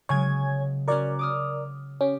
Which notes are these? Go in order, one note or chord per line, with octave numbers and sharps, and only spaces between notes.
C#3 F#3 G#3 C#5 G#5 G#6
C#4 F#4 A#4 C#5 D5
D6 D#6 F6
C#4 G4